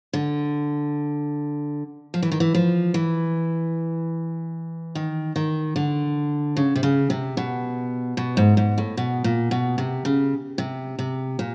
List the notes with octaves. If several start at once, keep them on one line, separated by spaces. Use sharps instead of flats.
D3
F3
E3
D#3
E3
F3
E3
D#3
D#3
D3
C#3
C3
C#3
C3
B2
B2
G#2
G#2
A2
B2
A#2
B2
C3
C#3
C3
C3
A#2